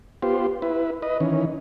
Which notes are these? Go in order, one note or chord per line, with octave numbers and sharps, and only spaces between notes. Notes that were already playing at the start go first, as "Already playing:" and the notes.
B3 F4 G4 C5
E4 B4
B4 D#5
D#3 E3 C#4